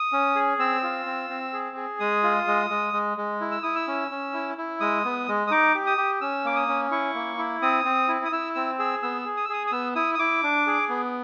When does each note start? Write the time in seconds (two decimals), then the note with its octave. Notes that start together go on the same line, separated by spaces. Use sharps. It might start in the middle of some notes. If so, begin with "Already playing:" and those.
Already playing: D#6
0.13 C#4
0.35 G#4
0.59 C4 E6
0.83 F4
1.06 C4
1.30 C4
1.53 G#4
1.77 G#4
2.00 G#3 D#6
2.23 F4
2.47 G#3
2.70 G#3
2.93 G#3
3.18 G#3
3.41 E4
3.51 E6
3.63 E4 D#6
3.75 E6
3.88 C#4
4.11 C#4
4.33 E4
4.58 E4
4.80 G#3 D#6
5.05 B3
5.28 G#3
5.47 D#6
5.51 D#4 D6
5.75 G4
5.86 D#6
5.98 G4
6.21 C#4 E6
6.44 A#3 D6
6.56 D#6
6.68 C#4
6.91 E4 C#6
7.15 A#3
7.38 E4
7.62 C4 D#6
7.85 C4
8.08 E4
8.25 D#6
8.32 E4 E6
8.55 C4 E6
8.79 G#4 E6
9.03 B3 E6
9.25 G#4
9.37 D#6
9.45 E6
9.49 G#4 D#6
9.67 D#6
9.72 B3 E6
9.95 E4 D#6
10.15 D#6
10.19 E4 D6
10.43 D4
10.67 G#4
10.89 B3